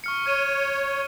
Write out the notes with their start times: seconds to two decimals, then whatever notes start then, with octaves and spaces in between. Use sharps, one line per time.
0.04 C#6 F6 C#7
0.26 C#5 F6 D#7